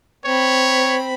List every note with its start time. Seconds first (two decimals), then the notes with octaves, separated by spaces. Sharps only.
0.25 C4 C#5 B5